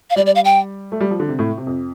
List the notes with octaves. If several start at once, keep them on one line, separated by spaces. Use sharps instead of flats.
F5
G3 D5
D5
F5
G5
A3
G3
F3
D3
C3
A2
C3
F2